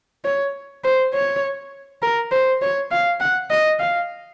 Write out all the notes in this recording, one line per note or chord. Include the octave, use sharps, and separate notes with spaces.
C#5
C5
C#5
A#4
C5
C#5
F5
F#5
D#5
F5